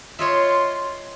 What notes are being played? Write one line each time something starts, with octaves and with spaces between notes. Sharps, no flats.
F4 C#5 D#5 E5 C6